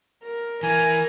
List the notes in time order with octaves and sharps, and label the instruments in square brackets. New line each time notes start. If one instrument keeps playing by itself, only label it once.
[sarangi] A#4
[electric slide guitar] E3 [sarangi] A#4 [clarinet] G#5